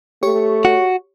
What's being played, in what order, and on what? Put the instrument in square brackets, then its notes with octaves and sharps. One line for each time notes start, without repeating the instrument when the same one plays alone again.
[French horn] A3 [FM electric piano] G4 C#5 C#6
[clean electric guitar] F#4